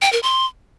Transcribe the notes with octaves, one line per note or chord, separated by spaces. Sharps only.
G5
A#4
C6